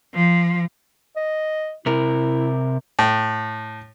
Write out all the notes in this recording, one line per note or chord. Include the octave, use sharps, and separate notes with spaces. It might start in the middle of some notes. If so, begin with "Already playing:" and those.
F3
D#5
C3 E4 A#4
A2